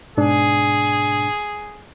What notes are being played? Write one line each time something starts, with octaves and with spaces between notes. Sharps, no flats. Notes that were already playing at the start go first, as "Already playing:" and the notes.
G#2 B2 D4 G#4